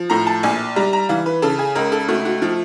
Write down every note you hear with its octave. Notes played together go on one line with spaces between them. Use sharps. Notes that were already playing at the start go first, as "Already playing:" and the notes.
Already playing: F3
A2 A#5
A5
A#1 G#5
G3 A#5
A#5
E3 F5
B4
C#3 A4
G#4
C#2 A#4
A4
A3 F#4
F#4
F3